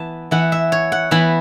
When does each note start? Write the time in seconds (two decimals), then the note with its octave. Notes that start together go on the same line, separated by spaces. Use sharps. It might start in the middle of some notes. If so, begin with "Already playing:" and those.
Already playing: E3 B3 E4 A5
0.31 E3 B3 E4 F#5
0.52 E5
0.72 C#5
0.92 F#5
1.11 E3 B3 E4 B5